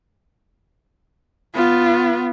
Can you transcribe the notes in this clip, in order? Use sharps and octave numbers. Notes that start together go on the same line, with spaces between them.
B3 F4